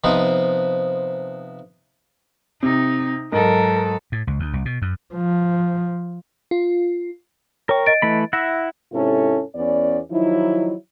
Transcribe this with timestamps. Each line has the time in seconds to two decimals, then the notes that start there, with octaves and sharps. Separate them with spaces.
0.04 C3 F3 B3 D#4
2.63 C3 D#4
3.33 G#2 F#3 A4 A#4
4.12 A2
4.27 C#2
4.40 D2
4.53 C2
4.65 B2
4.82 F#2
5.14 F3
6.51 F4
7.69 A#4 C#5 G5 C#6
7.86 D#5 A6 D7
8.02 E3 A3 B5
8.33 E4 E5 F#5 A#6
8.93 G#2 C3 C#4 E4 A4
9.55 E2 B3 C#4 D5
10.11 D#3 F3 F#3 D#4 E4